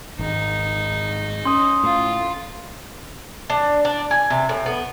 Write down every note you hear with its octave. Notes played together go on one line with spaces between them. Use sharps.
G#1 D#4
C#4 C6 D#6
A2 F4
D4
D4
G#5
C3
A2
B3